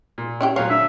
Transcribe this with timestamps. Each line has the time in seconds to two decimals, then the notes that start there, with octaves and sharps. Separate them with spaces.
0.18 A#2
0.41 C#4 E4 G4
0.56 A#2 F#3 C#5 F5
0.70 D3 E5